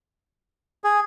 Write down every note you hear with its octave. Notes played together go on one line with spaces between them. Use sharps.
G#4